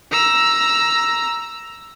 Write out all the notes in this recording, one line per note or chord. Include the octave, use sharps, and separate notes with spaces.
A#5 E6